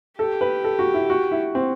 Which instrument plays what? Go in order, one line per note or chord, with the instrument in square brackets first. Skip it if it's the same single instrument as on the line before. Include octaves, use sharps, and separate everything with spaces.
[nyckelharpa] G4 [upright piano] A4
[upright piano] B4
A4
F#4
E4
F#4
E4
C4